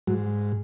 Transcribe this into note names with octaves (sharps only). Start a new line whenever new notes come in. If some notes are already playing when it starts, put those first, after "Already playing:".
G#2 F#3